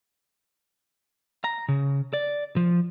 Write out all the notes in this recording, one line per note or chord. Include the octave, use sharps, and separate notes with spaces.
A#5
C#3
D5
F3